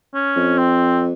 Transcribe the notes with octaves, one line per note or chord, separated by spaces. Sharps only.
C#4
F2
C4